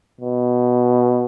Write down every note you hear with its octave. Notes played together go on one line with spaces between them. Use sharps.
B2